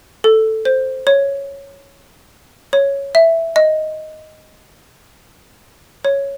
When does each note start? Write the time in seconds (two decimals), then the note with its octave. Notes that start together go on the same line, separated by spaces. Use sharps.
0.24 A4
0.65 C5
1.07 C#5
2.73 C#5
3.15 E5
3.56 D#5
6.05 C#5